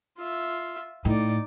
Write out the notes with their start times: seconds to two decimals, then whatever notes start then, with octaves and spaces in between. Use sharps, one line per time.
0.18 F4 E5
1.05 A2 D#4 D5